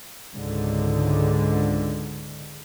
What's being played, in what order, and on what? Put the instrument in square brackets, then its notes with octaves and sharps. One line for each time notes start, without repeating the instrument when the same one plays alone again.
[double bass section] C#2 G#2 D3